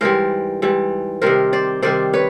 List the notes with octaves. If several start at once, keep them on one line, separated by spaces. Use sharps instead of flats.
G#2 E3 G3 A#4 C5
G#2 E3 G3
C3 D#3 G3 A#4 C5
C5 D5
C3 D#3 G3 C5 D5
B4 C#5